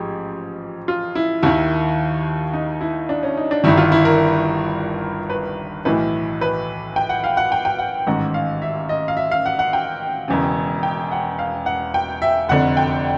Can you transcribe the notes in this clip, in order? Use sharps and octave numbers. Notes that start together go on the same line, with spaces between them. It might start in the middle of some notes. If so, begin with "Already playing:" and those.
Already playing: A1 G#2 F3 G4 G#4
F4
E4
D#2 D#3 E4
D#4
E4
D4
C#4
D#4
D4
G1 G2 D#3 E4
F4
E4
A#4
B4
B1 A2 E3 B4
B4
G5
F#5
F5
F#5
G5
G5
F#5
A1 G#2 D#3 F#5
F5
E5
D#5
F5
E5
F5
F#5
F#5
G5
E1 E2 C#3
G5
F#5
F5
F#5
G5
E5
F1 F2 D3 F#5
G5